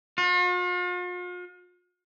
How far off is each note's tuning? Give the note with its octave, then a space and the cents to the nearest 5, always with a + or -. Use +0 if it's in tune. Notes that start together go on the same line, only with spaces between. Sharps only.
F4 +45